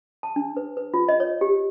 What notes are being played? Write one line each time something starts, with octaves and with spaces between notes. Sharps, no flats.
A5
D4
B4
B4
F4
D#5
C#5
G4